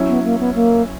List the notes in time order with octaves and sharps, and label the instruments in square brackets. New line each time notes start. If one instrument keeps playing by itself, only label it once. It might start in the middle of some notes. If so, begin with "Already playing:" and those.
Already playing: [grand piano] F#3 C#4 E4
[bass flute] B3
A#3
B3
A#3